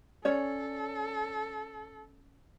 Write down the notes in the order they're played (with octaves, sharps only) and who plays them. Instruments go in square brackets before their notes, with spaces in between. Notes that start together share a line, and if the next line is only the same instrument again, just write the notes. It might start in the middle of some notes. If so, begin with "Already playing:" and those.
[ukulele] C#4 C#5 D5 [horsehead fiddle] A4